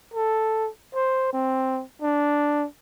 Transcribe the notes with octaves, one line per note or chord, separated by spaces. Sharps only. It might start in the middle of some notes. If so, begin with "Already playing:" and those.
A4
C5
C4
D4